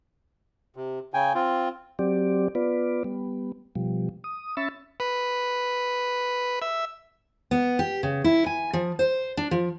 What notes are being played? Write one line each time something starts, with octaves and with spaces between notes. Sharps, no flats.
C3
C#3 G5 G#5
C4 F4
F#3 C4 G4 D5
B3 F4 B4 D5
G3 B3
B2 F3 G3
D#6
C#4 E5 B5 C#6 E6 A6
B4
E5
B3
G4
C#3
E4
G#5
F3
C5
D4
F3